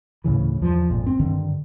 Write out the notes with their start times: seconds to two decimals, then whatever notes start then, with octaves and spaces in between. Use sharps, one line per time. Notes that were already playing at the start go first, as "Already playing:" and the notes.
0.24 D2 A2 C#3 E3
0.62 E2 F3
0.89 G#1 F2 A#2
1.06 C4
1.19 G2 D3 D#3